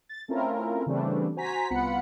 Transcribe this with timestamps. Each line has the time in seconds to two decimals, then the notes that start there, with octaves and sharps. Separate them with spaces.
0.09 A6
0.28 A3 C4 C#4 E4 F4 A#4
0.86 C#3 E3 G3 A3 C4 D4
1.36 F#4 C5 G#5 A#5 B6
1.70 C2 B3 F4 F#5 B5 C#7